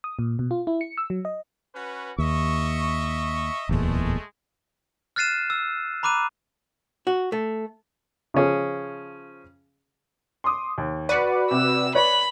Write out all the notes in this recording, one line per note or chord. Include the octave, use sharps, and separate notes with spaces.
D#6
A#2
B2
F4
E4
C#7
E6
F#3
D#5
C#4 F#4 B4
D#2 D#5 E5 C#6
D1 E2 A#2 G#3 A3
F6 F#6 A6 C7 D#7 E7
E6
A#5 B5 D6 F#6 D#7
F#4
A3
C#3 F3 C#4 G#4
C6 D6 D#6
D#2
F#4 B4 D5 C#7 D#7
C3 E6
B4 C#5 D5 B5